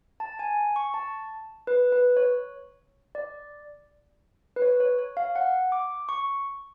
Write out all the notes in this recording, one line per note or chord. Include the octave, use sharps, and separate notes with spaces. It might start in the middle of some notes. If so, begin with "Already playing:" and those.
A5
G#5
C#6
A5
B4
B4
C#5
D5
B4
C#5
C#5
C#5
F5
F#5
D6
C#6